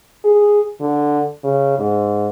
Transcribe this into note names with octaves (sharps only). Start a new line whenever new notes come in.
G#4
D3
C#3
G#2